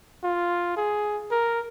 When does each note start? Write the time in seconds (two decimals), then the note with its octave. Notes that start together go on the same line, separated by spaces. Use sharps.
0.24 F4
0.77 G#4
1.31 A#4